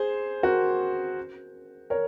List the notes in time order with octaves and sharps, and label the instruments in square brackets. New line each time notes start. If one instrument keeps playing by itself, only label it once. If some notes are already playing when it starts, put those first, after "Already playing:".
Already playing: [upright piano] G#4 C5
F#4 A#4
A#4 C#5